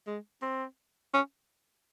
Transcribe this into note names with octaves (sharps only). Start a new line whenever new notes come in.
G#3
C4
C#4